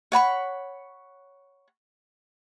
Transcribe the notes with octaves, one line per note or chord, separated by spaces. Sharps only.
C#5 F#5 B5 C#6